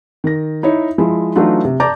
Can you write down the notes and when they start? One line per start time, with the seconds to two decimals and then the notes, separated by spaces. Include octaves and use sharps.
0.24 D#3 A#6
0.63 D#4 E4 C#5
0.98 F3 G#3 E4
1.36 E3 F#3 A3 D4 D#4 F4
1.65 C3
1.80 D5 A5 A#5 D6 G6 A6